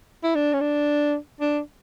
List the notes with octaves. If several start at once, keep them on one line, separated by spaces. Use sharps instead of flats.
E4
D4
C#4
D4
D4